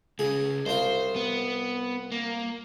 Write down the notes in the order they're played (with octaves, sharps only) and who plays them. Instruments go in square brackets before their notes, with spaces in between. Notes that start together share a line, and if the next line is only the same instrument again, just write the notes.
[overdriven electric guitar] C#2 C#3 [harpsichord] G#4
[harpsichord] C2 F4 [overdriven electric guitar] C5
[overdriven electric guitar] B3
A#3